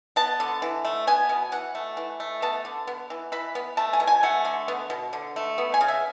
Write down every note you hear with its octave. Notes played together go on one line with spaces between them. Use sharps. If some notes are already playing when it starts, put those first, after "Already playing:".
B3 A5
D3
E3
A3
B3 G#5
B2
E3 F#5
A3
E3
A3
B3 A5
D3
B3
E3
E3 B5
B3
A3 A5
G#5
B2
G#5
A3 F#5
D3
B3
B2
D3
A3
B3
G#5
C#3
E5